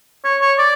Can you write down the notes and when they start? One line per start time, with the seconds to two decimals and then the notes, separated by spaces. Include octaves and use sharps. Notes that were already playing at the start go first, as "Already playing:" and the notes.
0.25 C#5
0.41 C#5
0.58 D5